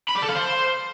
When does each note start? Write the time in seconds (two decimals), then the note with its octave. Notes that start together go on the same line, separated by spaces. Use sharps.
0.09 B5
0.16 D5
0.23 A4
0.29 F5
0.36 C5